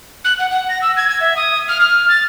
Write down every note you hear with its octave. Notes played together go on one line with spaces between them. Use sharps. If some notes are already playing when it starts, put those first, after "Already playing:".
F#6
F#5
F#5
A#6
E6
G#6
G#6
E5
D#6
F6
F6
A6